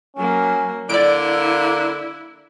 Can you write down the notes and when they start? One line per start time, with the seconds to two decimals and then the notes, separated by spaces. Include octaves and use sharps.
0.17 F#3 A#3 C#4
0.89 D3 A#3 E4 D5 D7